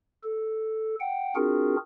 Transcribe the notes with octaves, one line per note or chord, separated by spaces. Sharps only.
A4
F#5 G5
C4 D4 F4 F#4 G#4 A#4